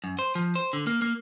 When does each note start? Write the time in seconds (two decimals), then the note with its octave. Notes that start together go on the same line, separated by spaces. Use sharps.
0.04 F#2
0.19 C5
0.35 F3
0.55 C5
0.73 D3
0.87 A#3
1.02 A#3